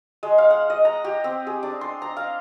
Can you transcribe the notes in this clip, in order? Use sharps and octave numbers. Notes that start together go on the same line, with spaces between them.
G#3
F5
F#5
D#5
A#5
G4
C4
G#4
D4
C6
A#5
F5